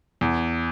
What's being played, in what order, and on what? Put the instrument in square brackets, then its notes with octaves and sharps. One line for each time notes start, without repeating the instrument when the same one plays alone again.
[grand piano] E2